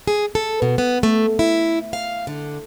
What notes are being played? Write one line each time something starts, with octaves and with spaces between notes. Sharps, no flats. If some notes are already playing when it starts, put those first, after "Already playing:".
G#4
A4
B2
B3
A3
E4
F5
D3